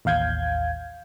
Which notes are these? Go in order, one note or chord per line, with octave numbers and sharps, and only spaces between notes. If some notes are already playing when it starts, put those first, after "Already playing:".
A1 D#2 F5 G6 G#6